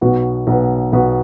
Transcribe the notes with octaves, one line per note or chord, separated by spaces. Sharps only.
B1 B2 B3 F#4 B4
B1 B2 B3 F#4 B4
B1 B2 B3 F#4 B4